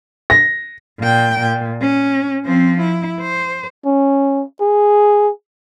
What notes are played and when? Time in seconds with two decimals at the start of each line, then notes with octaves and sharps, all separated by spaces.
0.30 A#6
1.00 A#2 G5
1.40 A#2
1.82 C#4
2.46 F3 C4
2.81 E4
3.22 C5
3.85 C#4
4.61 G#4